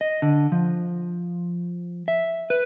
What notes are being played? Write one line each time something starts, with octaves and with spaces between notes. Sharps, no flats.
D#5
D3
F3
E5
B4